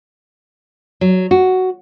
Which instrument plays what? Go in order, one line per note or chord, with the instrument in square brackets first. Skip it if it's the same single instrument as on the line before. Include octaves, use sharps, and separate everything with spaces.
[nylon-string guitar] F#3
F#4